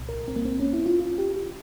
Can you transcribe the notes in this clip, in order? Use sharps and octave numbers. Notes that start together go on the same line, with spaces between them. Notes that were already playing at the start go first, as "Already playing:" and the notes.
Already playing: C2 A#2
A#4
C4
A#3
C4
C#4
E4
F4
F4
G4
G4